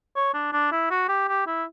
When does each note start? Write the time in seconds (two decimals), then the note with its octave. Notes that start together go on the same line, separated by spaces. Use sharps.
0.16 C#5
0.34 D4
0.53 D4
0.72 E4
0.91 F#4
1.08 G4
1.28 G4
1.47 E4